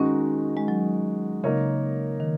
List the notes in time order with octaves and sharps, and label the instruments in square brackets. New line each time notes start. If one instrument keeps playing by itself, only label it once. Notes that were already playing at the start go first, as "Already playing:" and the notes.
Already playing: [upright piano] D#3 G#3 D#4 F#4 [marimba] C#4
[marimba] G#3
F#3
[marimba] C#3 [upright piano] A#3 D#4 A#4 C#5
[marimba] D#3